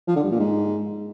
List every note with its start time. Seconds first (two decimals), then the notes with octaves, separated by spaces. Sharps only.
0.08 F3
0.15 D3
0.23 G2
0.31 A#2
0.39 G#2